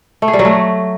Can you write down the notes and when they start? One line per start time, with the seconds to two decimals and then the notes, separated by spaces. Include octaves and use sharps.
0.22 A3
0.28 G#4
0.33 G3
0.39 F#3
0.45 A3